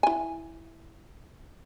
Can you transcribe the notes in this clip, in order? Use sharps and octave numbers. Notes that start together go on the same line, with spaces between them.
E4 G#5